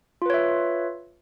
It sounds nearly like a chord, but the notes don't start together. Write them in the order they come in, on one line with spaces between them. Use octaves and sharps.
F4 B4 C#5 E5